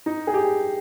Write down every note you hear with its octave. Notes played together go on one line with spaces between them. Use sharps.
D#4
G#4
G4